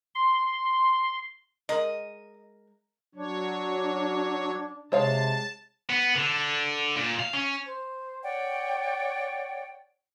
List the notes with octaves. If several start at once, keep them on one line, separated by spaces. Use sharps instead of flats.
C6
G#3 A#4 D#5
F#3 D4 C#5
C3 G#3 C#5 F5 A5
B3
D3
A#2
F5
C#4
C5
C#5 D5 F#5 G5